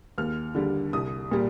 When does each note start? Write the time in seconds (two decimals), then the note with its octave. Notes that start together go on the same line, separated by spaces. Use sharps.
0.18 D#2 F6
0.55 D3 G3
0.93 C2 D#6
1.31 A#2 G3